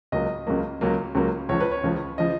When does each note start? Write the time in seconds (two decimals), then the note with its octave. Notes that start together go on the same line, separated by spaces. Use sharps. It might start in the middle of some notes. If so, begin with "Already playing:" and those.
0.12 C#2 C#3 F#3 A#3 D#5
0.47 C#2 C#3 F#3 A#3
0.81 C#2 C#3 F#3 A#3
1.15 C#2 C#3 F#3 A#3
1.49 C#2 C#3 F3 C#5
1.60 B4
1.71 C#5
1.84 C#2 C#3 F3
2.18 C#3 F3 D#5